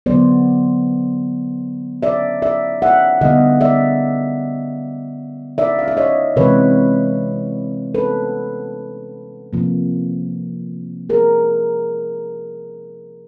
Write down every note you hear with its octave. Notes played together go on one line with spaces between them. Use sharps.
D3 F#3 B3 C5 D5
D5 E5
D5 E5
E5 F#5
D3 G3 B3 D#5 F5
D5 E5
D5 E5
F5
E5
C#5 D#5
C3 E3 G#3 B4 C#5
A4 B4
C3 F3 A#3
G#4 A#4